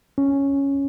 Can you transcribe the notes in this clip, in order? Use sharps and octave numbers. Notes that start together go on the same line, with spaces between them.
C#4